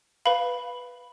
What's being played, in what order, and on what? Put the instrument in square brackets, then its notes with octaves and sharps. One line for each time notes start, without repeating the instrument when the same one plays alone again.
[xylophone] B4 F5 B5